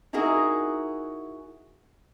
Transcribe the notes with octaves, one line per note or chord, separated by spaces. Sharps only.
D#4 E4 F#4 G#4 A#4